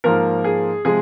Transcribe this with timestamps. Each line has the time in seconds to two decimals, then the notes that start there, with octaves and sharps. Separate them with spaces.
0.04 G#2 F3 A#3 A#4
0.44 G#4
0.84 C3 F3 G#3 G#4